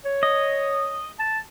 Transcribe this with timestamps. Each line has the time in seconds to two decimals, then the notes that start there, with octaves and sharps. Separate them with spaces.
0.05 C#5
0.23 D#5
1.20 A5